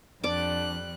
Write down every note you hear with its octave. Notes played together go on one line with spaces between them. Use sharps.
F2 G3 D4 D5 D6 F#6